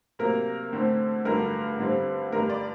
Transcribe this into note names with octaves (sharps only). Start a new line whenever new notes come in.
C3 F#3 A#3 A#4
D3 A3 C4
G2 D3 F#3 A3 A#4
G2 D3 G3 C4
G2 D3 G3 A#4
D5